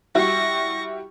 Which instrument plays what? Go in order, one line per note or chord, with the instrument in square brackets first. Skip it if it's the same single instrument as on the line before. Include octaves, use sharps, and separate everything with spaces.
[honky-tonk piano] G3 E4 F#4 [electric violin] C#6 A#6